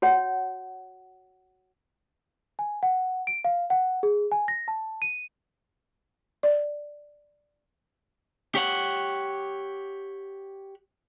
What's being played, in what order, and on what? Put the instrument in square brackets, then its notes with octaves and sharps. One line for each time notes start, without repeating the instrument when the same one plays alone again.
[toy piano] F#4 C#5 F#5
[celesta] G#5
F#5
D7
F5
F#5
G#4
G#5
A#6
A5
D#7
[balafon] D5
[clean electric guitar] G4 C#5 F#5